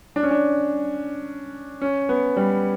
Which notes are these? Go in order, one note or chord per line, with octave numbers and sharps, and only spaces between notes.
D4
C#4
D4
C#4
B3
G3